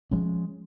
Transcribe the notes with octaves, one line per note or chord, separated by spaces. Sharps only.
F3 G#3 C#4